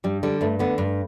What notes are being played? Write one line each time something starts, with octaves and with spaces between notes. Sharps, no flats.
G2 G3
D3 G3
G2 A3
D3 B3
G2